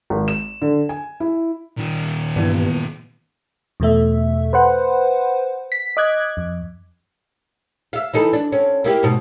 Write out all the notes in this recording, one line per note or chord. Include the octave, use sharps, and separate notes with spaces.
G#1
E7
D3
G#5
E4
A#2 D#3
G2 E3 B3
E2 B2 A3 E5
B4 C5 F#5
B6
D#5 D6 F#6 G#6
F2
E5 F5
E3 D#4 A4
D4
C4 C#4
A#3 E4 G4
G#2 B2